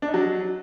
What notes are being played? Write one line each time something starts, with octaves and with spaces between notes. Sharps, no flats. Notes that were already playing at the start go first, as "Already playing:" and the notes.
D4
D#4
F#3